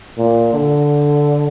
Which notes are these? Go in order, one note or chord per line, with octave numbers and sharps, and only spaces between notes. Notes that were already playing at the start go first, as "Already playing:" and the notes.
A#2
D3